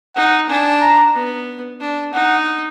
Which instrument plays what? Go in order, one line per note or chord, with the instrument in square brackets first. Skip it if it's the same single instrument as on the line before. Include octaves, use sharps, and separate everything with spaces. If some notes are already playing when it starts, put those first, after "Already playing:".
[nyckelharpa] D#4 [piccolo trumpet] F#5
[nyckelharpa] D4 [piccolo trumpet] G#5
[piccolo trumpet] A#5
[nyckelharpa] B3
D4
[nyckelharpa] D#4 [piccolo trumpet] F#5